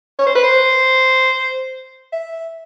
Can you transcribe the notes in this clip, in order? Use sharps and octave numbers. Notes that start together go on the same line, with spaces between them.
C#5
C5
B4
C5
E5